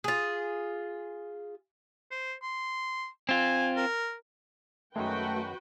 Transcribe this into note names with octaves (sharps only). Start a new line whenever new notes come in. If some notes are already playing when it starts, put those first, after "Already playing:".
F4 G#4
C5
C6
C4 F4 G#5
A#4
F#2 D#3 G#3 A3 F#4 B4 G5